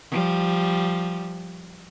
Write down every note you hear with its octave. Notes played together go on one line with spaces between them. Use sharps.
F3 G3